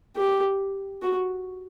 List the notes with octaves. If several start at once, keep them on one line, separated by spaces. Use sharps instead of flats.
G4
F#4